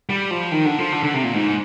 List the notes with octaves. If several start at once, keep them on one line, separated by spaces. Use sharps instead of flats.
G3
F3
D#3
D3
F3
D3
D3
C3
A#2
G#2